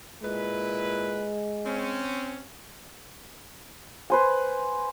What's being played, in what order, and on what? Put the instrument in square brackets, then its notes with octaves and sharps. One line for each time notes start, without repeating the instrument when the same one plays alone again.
[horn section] A#2 E4 B4 [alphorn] G#3
[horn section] C4 C#4
[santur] B4 C5 G#5